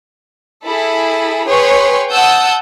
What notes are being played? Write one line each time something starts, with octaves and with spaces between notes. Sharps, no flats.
E4 G#4 A4 B5
G#4 B4 C#5 G5 C6 C#6
F#5 A5 D#6 E6 G6